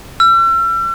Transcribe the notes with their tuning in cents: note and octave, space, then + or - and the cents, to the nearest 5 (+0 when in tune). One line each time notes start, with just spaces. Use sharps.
E6 +40